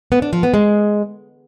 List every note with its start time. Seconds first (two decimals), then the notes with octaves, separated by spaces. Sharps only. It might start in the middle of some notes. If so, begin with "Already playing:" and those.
0.12 B3
0.22 D4
0.33 F3
0.43 B3
0.54 G#3